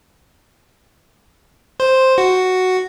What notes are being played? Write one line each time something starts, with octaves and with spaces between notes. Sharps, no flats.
C5
F#4